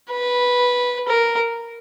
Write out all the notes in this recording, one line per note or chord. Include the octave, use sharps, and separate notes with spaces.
B4
A#4